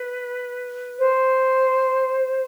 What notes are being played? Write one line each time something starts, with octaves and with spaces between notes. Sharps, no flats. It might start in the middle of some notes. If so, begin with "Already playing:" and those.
Already playing: B4
C5